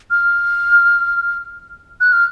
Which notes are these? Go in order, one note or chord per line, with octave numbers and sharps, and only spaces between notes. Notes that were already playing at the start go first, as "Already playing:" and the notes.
F6
F#6
F6